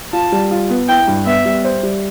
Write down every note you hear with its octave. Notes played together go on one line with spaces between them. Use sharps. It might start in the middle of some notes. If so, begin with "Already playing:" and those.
F4 A5
G3
F4
B3
E4 G5
G2
B3 E5
G3
C5
G3